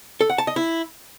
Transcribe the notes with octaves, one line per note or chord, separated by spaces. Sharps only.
A4
F#5
A5
D#5
E4